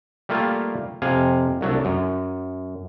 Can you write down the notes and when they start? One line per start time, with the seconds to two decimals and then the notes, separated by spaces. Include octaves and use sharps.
0.29 G3 A3 A#3 F4
1.02 F2 C3 F5 G#5
1.61 C2 F#3 A3 D4
1.85 F#2